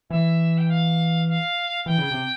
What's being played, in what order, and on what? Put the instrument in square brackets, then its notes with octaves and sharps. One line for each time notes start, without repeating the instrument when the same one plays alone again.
[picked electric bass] E3 [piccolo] E5
[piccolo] G5
F5
F5
[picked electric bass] E3 [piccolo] G5
[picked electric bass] C#3
C3